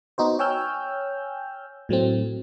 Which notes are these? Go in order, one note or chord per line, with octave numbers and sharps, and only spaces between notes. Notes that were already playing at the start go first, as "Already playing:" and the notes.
B3 D#4 F#4 C5
C#5 G5 G#5 E6 F6 G6
A2 F#3 A3 C4